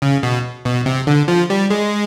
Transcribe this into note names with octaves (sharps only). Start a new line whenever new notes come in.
C#3
B2
B2
C3
D3
F3
G3
G#3